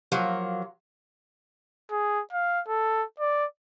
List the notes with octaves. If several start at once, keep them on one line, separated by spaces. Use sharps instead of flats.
F3 F#3 A#3
G#4
F5
A4
D5